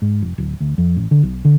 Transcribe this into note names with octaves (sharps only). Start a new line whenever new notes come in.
G#2
F1
D1
D2
F2
A1
D3
B1
D3